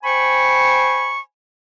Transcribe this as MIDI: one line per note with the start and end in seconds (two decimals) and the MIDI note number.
0.03 1.18 72
0.03 1.18 79
0.03 1.18 80
0.03 1.18 83
0.03 1.18 85